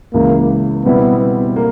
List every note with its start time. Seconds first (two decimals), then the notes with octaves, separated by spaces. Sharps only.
0.14 C#2 C#3 E3 A#3
0.85 B2 G3 B3 C4 E4
1.56 A#3